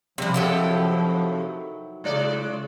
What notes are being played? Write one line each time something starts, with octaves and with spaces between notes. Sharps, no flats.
C3 F3 G3 C4 D4
C3 D#3 F#3 E4 G4 A4
A2 C#3 G#3 D5